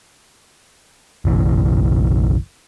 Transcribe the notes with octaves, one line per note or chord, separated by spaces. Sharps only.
F#1 B1 E3